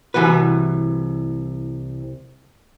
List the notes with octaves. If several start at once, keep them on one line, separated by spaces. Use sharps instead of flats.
C2 E3 F#4 B4